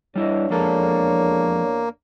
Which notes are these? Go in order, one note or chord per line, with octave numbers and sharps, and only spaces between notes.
E2 G3 D4 E4 C#5 D#5
F2 G#3 A#3 A4